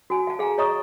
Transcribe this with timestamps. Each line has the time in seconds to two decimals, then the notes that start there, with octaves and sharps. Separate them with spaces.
0.10 F#4 G#5
0.27 F5 A5
0.39 G#4 F5 G#5 A#5
0.58 C#5 D#5 A#5 C#6 D#6